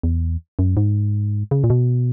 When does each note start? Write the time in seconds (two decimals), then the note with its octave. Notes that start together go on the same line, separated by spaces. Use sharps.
0.03 E2
0.59 F#2
0.77 G#2
1.51 C#3
1.64 A#2
1.70 B2